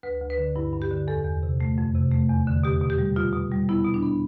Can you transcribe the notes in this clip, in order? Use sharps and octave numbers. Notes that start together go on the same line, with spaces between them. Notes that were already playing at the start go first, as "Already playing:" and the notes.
D2 B4
D2
B4
D3
G2 E4
G2
G4
D3
E2 A4
E2
C3
A3
F2
C3
A3
E2
D3
B2 G4
B2
G4
G3
B2 F4
B2
G3
B3 E4
B2
D4
B3